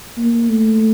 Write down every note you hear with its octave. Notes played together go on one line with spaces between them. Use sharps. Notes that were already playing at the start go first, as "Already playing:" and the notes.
A#3
A3